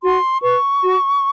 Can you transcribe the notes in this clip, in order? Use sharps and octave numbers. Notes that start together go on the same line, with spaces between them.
F#4 C6
B4 C#6
F#4